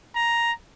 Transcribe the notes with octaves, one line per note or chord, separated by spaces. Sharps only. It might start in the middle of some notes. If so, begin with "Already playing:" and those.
A#5